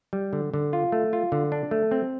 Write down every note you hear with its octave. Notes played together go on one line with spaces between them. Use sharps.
G3
D3
D3
F4
A3
F4
D3
D4
A3
C4